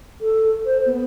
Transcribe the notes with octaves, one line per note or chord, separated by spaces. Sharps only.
A4
C5
B3